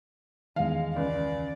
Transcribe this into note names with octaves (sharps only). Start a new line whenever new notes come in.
E2 D#3 G#3 F5
C#2 D5